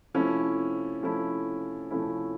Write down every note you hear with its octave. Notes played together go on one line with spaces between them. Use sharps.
C3 F3 A3 C#4 E4
C3 F3 A3 C#4 E4
C3 F3 A3 C#4 E4